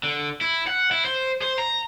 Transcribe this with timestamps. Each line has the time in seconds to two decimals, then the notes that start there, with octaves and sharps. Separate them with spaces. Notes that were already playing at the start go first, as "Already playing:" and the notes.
0.03 D3
0.41 E4
0.67 F#5
0.91 E4
1.04 C5
1.42 C5
1.58 A#5